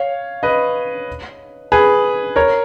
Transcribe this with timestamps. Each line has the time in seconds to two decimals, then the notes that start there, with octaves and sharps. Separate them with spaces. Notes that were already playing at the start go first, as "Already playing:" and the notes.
Already playing: C#5 F5
0.43 B4 D#5
1.72 G#4 B4
2.36 A#4 C#5